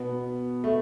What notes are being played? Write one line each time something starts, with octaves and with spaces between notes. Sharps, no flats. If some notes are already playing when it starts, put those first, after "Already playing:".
Already playing: B2 B3
A3